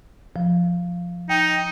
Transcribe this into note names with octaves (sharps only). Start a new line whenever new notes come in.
F3
D#4 G5